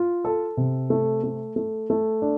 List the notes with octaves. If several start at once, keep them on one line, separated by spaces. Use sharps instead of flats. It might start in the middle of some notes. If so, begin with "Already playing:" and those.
Already playing: F4
A4
C3
A3
A3
A3
A3
D4